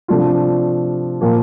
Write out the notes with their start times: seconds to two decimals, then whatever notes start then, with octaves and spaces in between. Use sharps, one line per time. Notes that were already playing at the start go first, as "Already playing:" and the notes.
0.08 C3 F3 A3 D4 F4
1.21 A#2 F3 A#3